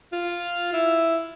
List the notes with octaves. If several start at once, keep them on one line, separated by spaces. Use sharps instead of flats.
F4
E4